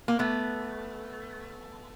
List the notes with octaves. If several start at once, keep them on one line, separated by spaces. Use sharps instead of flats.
A#3
A3 B3